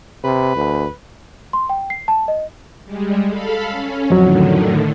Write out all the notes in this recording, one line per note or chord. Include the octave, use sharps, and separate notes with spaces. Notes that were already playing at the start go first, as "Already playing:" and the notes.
C3 B4
D2
C6
G5
C7
A5
D#5
G3 G#3
A4 F5 B5
C#4
F2 A2 D3 D#3 F#3